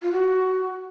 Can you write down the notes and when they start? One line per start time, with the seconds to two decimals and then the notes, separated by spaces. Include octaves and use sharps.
0.02 F4
0.12 F#4